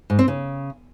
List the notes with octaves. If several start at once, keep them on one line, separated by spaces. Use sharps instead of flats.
G#2
C4
C#3